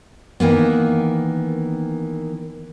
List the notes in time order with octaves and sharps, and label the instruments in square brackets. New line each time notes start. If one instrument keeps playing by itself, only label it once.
[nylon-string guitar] D#3 E3 A#3 B3